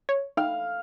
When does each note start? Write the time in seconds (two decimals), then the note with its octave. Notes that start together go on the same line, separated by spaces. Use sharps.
0.09 C#5
0.37 D#4 F5 G5 F6